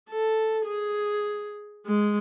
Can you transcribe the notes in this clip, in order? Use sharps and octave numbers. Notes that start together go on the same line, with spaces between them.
A4
G#4
G#3